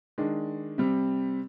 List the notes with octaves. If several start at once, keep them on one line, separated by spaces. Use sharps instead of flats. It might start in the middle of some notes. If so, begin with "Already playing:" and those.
D#3 G#3 D4
C3 G3 C4